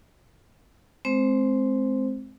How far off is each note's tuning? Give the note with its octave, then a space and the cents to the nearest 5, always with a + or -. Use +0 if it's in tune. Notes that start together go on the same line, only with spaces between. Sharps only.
G#3 +35 C4 +0 C5 +0